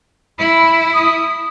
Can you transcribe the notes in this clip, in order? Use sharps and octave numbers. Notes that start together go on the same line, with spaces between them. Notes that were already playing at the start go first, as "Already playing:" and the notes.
E4 B5
D#6